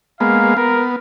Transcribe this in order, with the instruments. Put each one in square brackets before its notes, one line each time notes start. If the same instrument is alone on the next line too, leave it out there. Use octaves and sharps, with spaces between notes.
[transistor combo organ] G#3 A#3 B3 [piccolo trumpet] F5
[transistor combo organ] B3 [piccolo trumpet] A#4